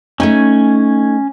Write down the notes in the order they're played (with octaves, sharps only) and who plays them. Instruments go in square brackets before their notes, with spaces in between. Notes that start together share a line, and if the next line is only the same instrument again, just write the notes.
[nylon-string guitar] A3 D#4 [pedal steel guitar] C#4 G#5